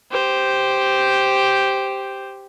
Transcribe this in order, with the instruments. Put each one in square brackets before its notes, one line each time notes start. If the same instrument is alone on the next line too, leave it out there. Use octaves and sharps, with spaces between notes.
[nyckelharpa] G4 C5